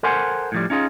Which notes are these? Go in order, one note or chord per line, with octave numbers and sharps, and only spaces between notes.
A4 A#4 C5 F#5 G#5
A2 F3 G3
C#4 D#4 F4 G#4